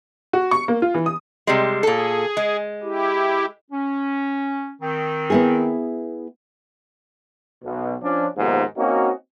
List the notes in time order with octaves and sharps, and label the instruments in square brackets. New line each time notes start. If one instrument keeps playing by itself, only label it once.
[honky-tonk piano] F#4
C#6
A#3
F4
E3
D#6
[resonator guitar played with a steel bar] C3 G3 G#3
[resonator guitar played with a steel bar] A#2 A4 [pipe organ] G#4
[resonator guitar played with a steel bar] G#3
[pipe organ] E4 G4
[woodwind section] C#4
D#3 C4
[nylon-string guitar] B3 E4 G#4
[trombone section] B1 B2
F3 C#4 D4
A#1 D#2 G#2 C3 B3 F4
A#3 C4 C#4 D#4 F#4